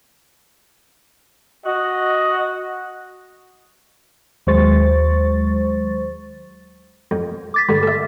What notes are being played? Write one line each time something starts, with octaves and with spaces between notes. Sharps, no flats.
F#4 D#5
D#2 F#3 G#3 C5 C#6 A6
F2
D6 A6 B6
G2 D3
A4 E5